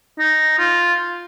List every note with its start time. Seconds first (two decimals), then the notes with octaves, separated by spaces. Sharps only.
0.19 D#4
0.59 F4